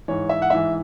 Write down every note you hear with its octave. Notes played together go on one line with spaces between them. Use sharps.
G#2 E3 C#5
E5
F#5
G#2 E3 E5